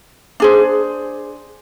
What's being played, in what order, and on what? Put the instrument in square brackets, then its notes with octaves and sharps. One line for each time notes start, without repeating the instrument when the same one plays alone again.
[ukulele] D4 G#4 C5